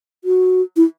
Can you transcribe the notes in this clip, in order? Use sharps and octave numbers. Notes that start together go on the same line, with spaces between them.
F#4
E4